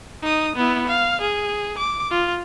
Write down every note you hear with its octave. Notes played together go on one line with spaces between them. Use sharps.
D#4 D#6
B3 E4
F5
G#4
D6
F4